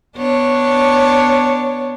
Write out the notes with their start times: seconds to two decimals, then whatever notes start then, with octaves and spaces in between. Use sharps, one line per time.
0.16 B3 D4 C#5